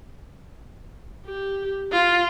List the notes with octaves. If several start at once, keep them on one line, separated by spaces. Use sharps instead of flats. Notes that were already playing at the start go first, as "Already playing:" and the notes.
G4
F4